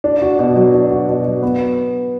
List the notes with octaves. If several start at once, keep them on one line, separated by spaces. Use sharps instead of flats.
D4
F#4
B2
F#3
D4
F#4
B2
F#3
B3